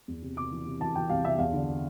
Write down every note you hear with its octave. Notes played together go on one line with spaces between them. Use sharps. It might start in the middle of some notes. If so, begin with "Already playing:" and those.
E2
C3
C3 D6
E3
C3
E3 A5
E3 G5
C2 F5
C3 E5
E2 F5
D3